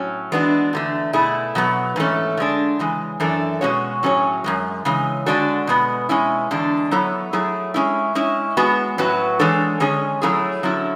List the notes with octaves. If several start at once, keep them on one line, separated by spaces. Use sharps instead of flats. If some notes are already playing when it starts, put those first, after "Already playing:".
Already playing: A2 F#3 C#4
E3 G#3 B3 D4 F#4
E2 D3 A3
B2 A3 E4 G#4
B2 F#3 B3
G#2 E3 A3 C#4
D3 G#3 D4
C#3 E3 G#3
F#2 E3 A3 D4 A4
B2 G#3 C#4 F#4 C#5
A2 F#3 C#4 G#4 C#5
F#2 C#3 G#3
C#3 E3 G#3
D3 G#3 D4 F#4 A4
B2 G#3 B3
B2 G#3 C#4 E4
E2 D3 G#3 D4
F#3 B3 E4 A4 C#5
F#3 A3 E4 G#4
G#3 C#4 E4
G#3 C#4 E4
G#3 B3 F#4
A2 F#3 C#4 F#4 B4
E3 G#3 D4 A4 C#5
D3 G#3 C#4 G#4 C#5
F#3 A3 C#4 E4 G#4
D3 F#3 C#4 E4